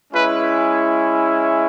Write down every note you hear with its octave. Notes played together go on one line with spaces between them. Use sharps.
G#3 C#4 E4 B4